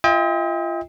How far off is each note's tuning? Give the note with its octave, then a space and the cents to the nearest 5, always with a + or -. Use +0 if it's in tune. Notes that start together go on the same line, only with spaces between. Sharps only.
F4 -25 D#5 +45 G5 +30